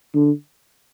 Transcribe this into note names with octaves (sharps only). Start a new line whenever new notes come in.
D3